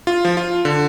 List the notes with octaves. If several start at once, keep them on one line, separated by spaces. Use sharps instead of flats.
F4
F3
F4
D3